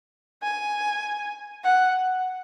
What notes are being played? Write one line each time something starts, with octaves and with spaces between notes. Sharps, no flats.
G#5
F#5